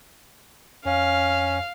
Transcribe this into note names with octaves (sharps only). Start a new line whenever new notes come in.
F2 C#4 F5